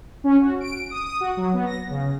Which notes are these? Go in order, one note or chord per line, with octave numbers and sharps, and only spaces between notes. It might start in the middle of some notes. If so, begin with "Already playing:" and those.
C#4
F#4
D7
D#6
D#6
F#4
F#3
B3
A#6
C#3